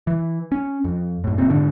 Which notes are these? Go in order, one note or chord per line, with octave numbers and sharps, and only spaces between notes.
E3
C#4
F2
F#2 A2
F1 A#2 C4
G#2 D3 D4